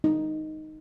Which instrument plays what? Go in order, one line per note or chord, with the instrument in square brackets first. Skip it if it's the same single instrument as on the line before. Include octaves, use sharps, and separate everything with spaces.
[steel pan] D#4